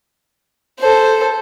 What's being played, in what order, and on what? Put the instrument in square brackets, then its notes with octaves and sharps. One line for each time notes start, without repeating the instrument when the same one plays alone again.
[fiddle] A4 C5